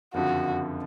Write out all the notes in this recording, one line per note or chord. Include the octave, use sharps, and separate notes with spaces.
F#1 F2 D3 F3 F#4